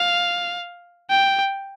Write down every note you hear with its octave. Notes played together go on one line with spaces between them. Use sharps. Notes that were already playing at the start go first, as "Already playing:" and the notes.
Already playing: F5
G5